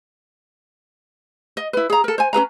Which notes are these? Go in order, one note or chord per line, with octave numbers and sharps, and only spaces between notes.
D#5
E4 B4
G#4 A#5
A4 A#4
C5 G#5
C#4 G#4 B4 A#5